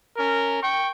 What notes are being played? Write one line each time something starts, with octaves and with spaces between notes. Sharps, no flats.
C#4 A#4
G5 C#6